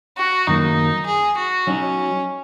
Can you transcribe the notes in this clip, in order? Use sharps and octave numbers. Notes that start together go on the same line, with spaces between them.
F#4
F#2 D#3 F#3 A#3 D#4
G#4
F#4
F#3 C#4 D#4 F#4 C#5